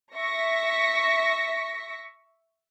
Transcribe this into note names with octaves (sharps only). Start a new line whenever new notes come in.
E5 C#6 A#6 B6